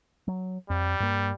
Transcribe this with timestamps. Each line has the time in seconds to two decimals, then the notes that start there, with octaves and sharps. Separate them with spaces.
0.28 F#3
0.70 F2 G3
1.00 G2 A#3